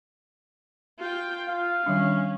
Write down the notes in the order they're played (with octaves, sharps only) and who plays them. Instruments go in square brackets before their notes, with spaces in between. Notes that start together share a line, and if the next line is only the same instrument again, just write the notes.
[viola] F4 G5
[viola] F4 [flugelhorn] F5
[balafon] D#3 G3 D4 [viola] C#4